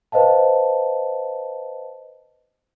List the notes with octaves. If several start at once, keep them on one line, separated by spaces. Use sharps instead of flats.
B4 C5 D#5 F5 A5